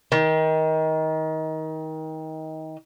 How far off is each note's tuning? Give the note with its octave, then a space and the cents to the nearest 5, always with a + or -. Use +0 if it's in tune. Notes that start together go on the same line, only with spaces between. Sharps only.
D#3 +25